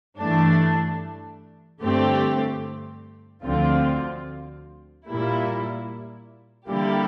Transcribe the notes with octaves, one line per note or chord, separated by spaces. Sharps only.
G2 E3 A3 D4
G2 D3 A3 C4 G4
D2 D3 F3 C4 F4
A#2 G3 A#3 E4
D3 G3 A#3 E4 G4